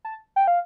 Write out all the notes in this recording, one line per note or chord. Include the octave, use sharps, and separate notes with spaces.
A5
G5
F5